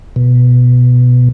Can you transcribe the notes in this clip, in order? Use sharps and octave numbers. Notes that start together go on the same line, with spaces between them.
B2